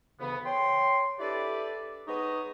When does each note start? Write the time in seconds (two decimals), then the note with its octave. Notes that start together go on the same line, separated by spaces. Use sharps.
0.20 D2 G#2 C#3 E3 B3
0.45 C#5 G5 C6
1.19 D4 E4 G4 A4 B4 D5
2.07 G#3 B3 D#4 B4 C#5 D#5